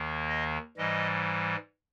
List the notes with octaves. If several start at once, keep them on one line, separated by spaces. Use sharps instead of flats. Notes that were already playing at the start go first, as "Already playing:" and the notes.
Already playing: D#2 D#3 A#3
D#5
G#2 E3 G3 D#5